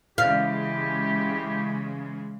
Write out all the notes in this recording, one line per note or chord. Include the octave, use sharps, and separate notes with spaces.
C#3 E3 G#3 E4 G4 F5